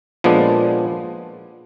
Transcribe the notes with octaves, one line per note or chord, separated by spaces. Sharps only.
A#2 F3 G#3 B3 D4